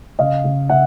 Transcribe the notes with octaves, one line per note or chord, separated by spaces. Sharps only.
C#3 D#5 F5
C#3
C#3 E5 F#5